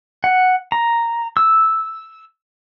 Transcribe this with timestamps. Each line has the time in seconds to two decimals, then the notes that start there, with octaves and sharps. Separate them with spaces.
0.24 F#5
0.72 A#5
1.37 E6